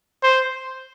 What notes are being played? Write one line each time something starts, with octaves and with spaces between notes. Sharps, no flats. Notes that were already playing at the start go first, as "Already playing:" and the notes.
C5